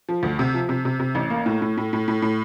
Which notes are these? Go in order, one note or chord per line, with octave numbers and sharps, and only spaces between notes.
F3
D2
C3
F3
C3
C3
C3
A1
A#3
A2
A2
A2
A2
A2
A2